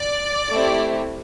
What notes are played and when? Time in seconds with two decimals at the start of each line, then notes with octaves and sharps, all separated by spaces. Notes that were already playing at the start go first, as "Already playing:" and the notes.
Already playing: D5
0.51 A3 C4 E4 G4